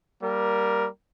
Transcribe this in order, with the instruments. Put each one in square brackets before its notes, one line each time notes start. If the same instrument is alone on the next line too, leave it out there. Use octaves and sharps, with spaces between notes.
[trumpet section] G3 A#3 A#4